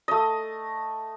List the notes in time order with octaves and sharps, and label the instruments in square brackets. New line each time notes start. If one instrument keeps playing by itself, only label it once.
[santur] A3 D#5